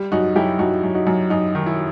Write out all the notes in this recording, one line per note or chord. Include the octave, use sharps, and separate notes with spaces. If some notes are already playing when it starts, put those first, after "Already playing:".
Already playing: G3
F#2 D#4 F#4
F#2 E4 G4
F#2 D#4 F#4
F#2
D#4 F#4
F#2
F#2 D#4
D#3
E4